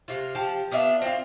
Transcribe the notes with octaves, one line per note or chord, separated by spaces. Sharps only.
C3 F4
F3 G4 A5
B3 D4 F4 E5
C4 F4